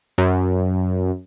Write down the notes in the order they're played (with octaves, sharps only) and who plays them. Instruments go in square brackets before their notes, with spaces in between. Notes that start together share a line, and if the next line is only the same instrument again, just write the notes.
[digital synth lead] F#2